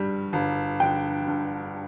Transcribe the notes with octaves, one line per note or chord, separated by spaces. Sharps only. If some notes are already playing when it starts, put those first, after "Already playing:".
Already playing: G2 D3 G3
G1
D3 G5
G2